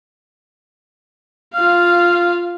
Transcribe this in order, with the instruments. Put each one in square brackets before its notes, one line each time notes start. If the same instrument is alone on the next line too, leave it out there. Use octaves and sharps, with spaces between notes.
[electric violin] F4 F5 [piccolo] F6